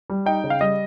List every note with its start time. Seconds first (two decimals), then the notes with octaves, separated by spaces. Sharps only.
0.10 G3
0.26 D#4 G5
0.44 C#3
0.50 F5
0.60 G3 D#5